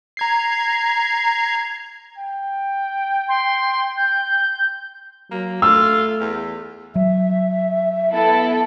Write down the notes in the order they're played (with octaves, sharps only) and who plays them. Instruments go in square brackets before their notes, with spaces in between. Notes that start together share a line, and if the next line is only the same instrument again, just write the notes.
[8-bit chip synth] A#5 G#6 C7
[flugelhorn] G5
[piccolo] C6
G6
[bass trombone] F#3 [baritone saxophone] A#3
[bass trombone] A3 [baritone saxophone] F4 [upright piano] E6
[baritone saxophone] E2
[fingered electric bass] F#3 [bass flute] E5
[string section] B3 E4 A4